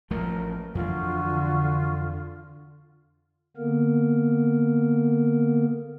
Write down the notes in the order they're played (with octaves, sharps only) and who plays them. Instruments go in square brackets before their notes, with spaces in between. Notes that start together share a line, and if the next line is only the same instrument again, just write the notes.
[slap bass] A1 F3 A3 [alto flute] A#4
[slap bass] F2 E3 [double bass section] D3 [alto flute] F4 [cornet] F#4
[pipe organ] D3 A#3 B3 A#4